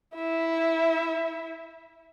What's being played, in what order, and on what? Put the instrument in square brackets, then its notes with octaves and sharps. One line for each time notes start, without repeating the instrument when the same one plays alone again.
[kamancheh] E4 E5